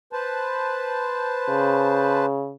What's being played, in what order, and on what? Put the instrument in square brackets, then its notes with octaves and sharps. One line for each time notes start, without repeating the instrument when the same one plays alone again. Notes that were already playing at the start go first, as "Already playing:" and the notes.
[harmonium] B4 C5 A5
[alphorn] C#3